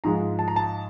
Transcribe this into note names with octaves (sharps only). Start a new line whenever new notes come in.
G#2 F3 G#3 A#5
A5
A#5
A5